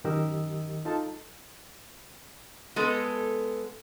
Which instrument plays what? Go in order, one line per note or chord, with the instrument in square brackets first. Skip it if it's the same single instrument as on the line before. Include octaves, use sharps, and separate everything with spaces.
[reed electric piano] F#2 D#3 G4 A#4 D#5 E6
D#4 F4 A4 A5
[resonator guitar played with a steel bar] G#3 B3 A4